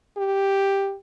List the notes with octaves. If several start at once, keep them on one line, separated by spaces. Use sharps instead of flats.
G4